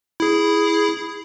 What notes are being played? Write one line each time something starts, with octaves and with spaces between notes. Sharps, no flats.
E4 G#4